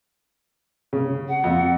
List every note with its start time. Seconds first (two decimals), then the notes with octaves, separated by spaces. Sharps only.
0.93 C#3
1.29 F#5
1.44 F2